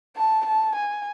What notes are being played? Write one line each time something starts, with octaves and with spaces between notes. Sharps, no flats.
A5
A5
G#5